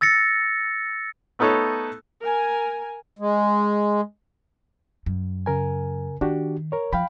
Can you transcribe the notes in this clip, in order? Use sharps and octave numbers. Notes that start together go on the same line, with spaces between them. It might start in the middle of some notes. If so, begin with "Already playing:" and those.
E6 A6 A#6 C#7
A3 B3 D#4 A4 C#5
A#4 G#5
G#3
F#2
C#3 A#4 G#5
D#3 D4 F#4 G4
A#4 C#5
F3 F5 G5 B5